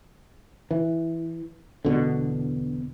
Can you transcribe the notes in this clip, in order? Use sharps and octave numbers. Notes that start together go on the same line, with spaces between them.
E3
E1 B2 D3